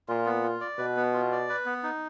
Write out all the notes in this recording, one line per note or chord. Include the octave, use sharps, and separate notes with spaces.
A#2 F4
B3
F4
D5
B2 B4
B3
F4
D5
B4
B3
D#4